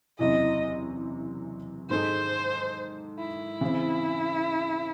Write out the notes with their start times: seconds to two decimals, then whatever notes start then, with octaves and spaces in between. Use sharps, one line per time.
0.19 F#1 E2 C3 E3 D#5
1.90 G#2 D#3 G#3 D#4 A4 C5
3.19 E4
3.61 C#3 E3 C4